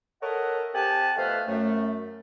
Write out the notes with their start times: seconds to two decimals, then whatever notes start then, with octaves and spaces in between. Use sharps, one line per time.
0.22 A4 A#4 C#5 D#5 E5 F#5
0.74 C4 G4 F#5 G#5 A5
1.17 B2 F3 A3 B4 C5 F5
1.48 F#2 A3